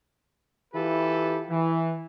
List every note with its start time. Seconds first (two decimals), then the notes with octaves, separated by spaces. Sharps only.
0.74 E3 E4 F4 G4 A4 B4
1.49 E3